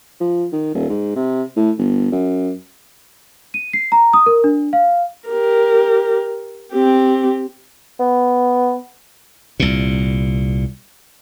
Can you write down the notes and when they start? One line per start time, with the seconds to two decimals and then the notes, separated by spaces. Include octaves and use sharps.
0.20 F3
0.53 D#3
0.75 D#1
0.89 G#2
1.16 C3
1.57 A2
1.78 G1
2.12 F#2
3.54 D#7
3.73 C7
3.92 A#5
4.13 D#6
4.26 A#4
4.44 D4
4.73 F5
5.28 G4 A#4
6.72 C4 G4
7.99 B3
9.60 C2 A#2